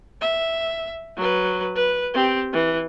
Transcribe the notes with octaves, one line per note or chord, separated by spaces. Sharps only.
E5
F#3 B4
B4
C4 G4
E3